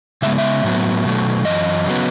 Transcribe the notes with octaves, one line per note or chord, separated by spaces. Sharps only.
C#3 G#3 B3 E5
E5
A2 F#3 B3
B2 F#3 A3
F#2 E3 D#5
C#3 F#3 B3